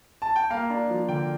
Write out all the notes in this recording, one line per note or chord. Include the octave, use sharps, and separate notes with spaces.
A5
G5
A#3 F5
D4
F3
D3 G5